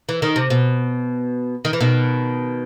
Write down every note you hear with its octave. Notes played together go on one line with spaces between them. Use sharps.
E3
D#3
C3
B2
D#3
E3
B2 D#3